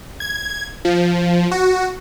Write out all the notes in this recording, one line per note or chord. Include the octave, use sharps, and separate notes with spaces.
G#6
F3
F#4